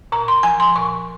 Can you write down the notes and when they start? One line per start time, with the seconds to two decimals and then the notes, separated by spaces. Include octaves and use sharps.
0.12 A#2 A#5
0.28 C6
0.43 F3 G#5
0.60 C6
0.76 A#2 C#6